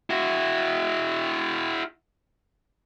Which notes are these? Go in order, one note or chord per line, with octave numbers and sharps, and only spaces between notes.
E4 F#4